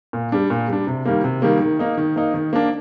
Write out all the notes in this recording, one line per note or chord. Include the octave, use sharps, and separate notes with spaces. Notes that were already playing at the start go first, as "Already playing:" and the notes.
A#2
G3 D4
A#2
G3 D4
C3
D#3 G3 A#3
C3
D#3 G3 A#3
D#3
A#3 D#4
D#3
A#3 D#4
D#3
A#3 D4